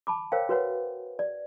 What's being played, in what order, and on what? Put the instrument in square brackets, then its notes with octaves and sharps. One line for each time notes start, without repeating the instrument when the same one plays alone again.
[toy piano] A5 B5 D6
A#4 C5 C#5 F5 G5
F#4 B4 C#5 F#5
D5